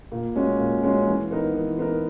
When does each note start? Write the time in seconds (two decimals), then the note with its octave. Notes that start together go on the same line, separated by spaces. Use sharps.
0.12 A#2
0.35 G#3 C#4 F#4 C#5
0.59 A#2
0.83 G#3 C#4 F#4 C#5
1.07 E3
1.31 B3 D#4 A#4
1.55 E3
1.79 B3 D#4 A#4